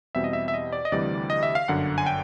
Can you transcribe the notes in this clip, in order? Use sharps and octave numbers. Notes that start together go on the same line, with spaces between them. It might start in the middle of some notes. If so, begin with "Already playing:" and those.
E2 B2 G3 C4 E5
D#5
E5
E5
D#5
D5
D#5
D2 C3 E3 G3 D5
D#5
E5
F5
G1 F#2 D3 F#5
G#5
G5